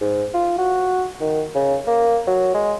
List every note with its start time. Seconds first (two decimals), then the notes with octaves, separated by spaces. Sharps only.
0.01 G#2
0.34 F4
0.58 F#4
1.21 D#3
1.55 C#3
1.87 A#3
2.27 F#3
2.54 G#3